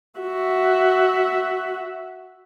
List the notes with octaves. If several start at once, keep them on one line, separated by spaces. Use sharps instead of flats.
F#4 E5